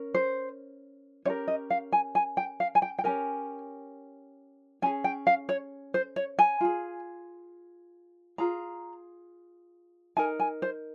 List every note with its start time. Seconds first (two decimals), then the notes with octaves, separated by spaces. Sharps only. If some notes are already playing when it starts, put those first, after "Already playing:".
Already playing: C#4 A#4
0.14 C5
1.25 C#4 G4 A#4 C#5
1.48 D#5
1.70 F5
1.92 G#5
2.15 G#5
2.37 G5
2.60 F5
2.75 G#5
2.82 G5
2.99 G5
3.04 C#4 G4 A#4 G#5
4.82 C#4 G#4 G#5
5.04 G5
5.27 F5
5.49 C#5
5.94 C5
6.16 C#5
6.39 G#5
6.61 F4 G#4
8.38 F4 G#4 A#5
10.17 D#4 A#4 G#5
10.40 G#5
10.62 C5